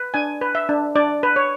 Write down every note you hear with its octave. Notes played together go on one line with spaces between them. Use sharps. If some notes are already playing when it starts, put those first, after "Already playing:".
Already playing: B4
D4 G#5
B4
E5
D4
D4 D5
B4
C#5